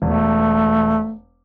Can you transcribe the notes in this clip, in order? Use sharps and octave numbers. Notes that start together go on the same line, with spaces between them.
E1 A3